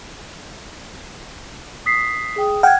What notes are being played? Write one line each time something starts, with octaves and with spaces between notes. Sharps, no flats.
D#6 B6 C7
G#4 G5 D#6
F#5 G5 F6 G#6